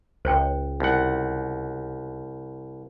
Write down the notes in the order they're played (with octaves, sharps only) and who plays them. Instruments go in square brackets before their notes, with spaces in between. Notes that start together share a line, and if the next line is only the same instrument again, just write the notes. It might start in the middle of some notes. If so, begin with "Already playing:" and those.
[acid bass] C#2 [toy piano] C5 C#5 G5
[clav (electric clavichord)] C2 F#5